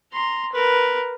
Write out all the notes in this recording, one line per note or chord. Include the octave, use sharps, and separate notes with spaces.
A#5 C6
A#4 B4